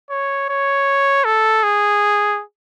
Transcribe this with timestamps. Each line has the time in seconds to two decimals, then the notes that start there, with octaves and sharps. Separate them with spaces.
0.10 C#5
0.49 C#5
1.25 A4
1.63 G#4